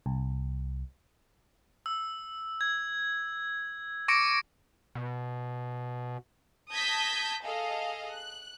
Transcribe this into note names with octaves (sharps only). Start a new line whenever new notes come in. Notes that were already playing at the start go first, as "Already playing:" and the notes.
C2
E6
G#6
C#6 D6 A#6 C#7 D7
B2
A5 D#6 G6 G#6 A#6 B6
G#4 A4 D#5 F5
F#6